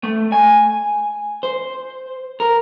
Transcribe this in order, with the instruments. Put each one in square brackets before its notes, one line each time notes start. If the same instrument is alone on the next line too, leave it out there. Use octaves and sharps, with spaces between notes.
[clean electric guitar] A3
G#5
C5
A#4